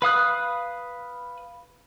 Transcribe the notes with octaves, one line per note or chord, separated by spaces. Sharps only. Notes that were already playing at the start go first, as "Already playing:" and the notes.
B4 F5 D#6 F#6